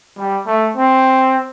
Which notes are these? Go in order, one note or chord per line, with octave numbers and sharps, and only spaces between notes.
G3
A3
C4